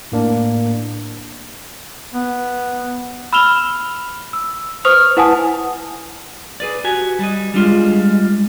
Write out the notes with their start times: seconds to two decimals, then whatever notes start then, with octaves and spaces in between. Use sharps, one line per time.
0.12 A2 A#3 D4
2.14 B3
3.33 B5 E6 F6 E7 F7 G7
4.33 E6
4.85 B4 C5 C#6 D#6 F6 F7
5.17 E4 B4 F#5 G#5 A5 D#6
6.60 G#4 B4 D5
6.84 F#4 G4 G#5
7.19 G3 D#5
7.54 G3 G#3 D4 F4